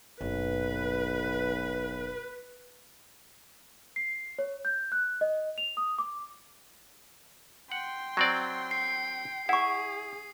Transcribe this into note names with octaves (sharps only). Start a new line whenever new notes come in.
F#1 B1 B4
C7
C#5
G6
F#6
D#5
F7
D#6
D6
F#5 G5 C6
F#3 C4 D5
C7
E4 G#4 F#5 C#6